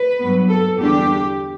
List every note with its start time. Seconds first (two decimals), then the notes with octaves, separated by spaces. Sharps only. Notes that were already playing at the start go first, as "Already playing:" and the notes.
Already playing: B4
0.19 G2 F#3 B3
0.48 A4
0.79 E2 D3 G3 D4 G4